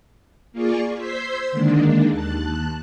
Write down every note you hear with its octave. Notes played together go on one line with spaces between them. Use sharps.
A#3 F4 G#4 D5 C#6
C5 C6 E6 G6 G#6 B6
D3 D#3 G#3 A#3 D4
D#2 A5 F#6